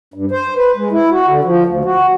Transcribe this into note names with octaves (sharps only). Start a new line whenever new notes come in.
G2
C5
B4
G#3
E4
F#4
D3
F3
D2
F#4